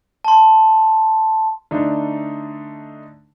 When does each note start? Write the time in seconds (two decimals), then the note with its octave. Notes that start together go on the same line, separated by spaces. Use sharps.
0.25 A5 C6
1.71 D3 A3 D4 D#4